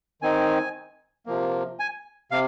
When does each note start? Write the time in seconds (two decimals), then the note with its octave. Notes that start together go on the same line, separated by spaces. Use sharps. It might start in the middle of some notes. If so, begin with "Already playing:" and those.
0.22 D#3 C4 D#4 G#5
1.26 C3 F3 A#3
1.79 G#5
2.31 C3 F5